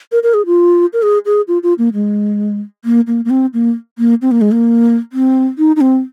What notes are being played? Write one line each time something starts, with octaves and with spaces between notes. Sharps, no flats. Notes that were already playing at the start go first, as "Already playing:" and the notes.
A#4
A#4
G#4
F4
A#4
G#4
G#4
F4
F4
A#3
G#3
A#3
A#3
A#3
C4
A#3
A#3
C4
A#3
G#3
A#3
C4
D#4
D#4
C4